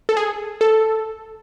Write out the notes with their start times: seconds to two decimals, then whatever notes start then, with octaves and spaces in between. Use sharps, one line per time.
0.09 A4
0.17 G#4
0.61 A4